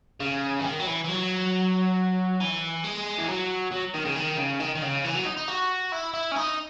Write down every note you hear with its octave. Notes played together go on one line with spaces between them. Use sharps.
C#3
E3
D#3
F#3
E3
E3
F#3
E3
G#3
E3
F#3
F#3
D#3
C#3
D#3
C#3
D#3
D#3
C#3
E3
F#3
D#4
D#4
F#4
E4
E4
C#4
D#4